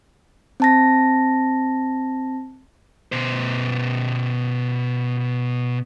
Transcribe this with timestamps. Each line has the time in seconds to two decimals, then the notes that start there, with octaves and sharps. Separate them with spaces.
0.60 C4 A5 A#6
3.12 B2 C5